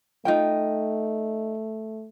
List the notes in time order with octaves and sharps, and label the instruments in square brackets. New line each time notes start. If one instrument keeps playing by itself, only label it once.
[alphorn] A3 [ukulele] D#4 F4 G5